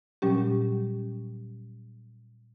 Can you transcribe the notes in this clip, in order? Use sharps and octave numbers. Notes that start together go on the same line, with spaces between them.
A#2 F#3 G3 C#4 G4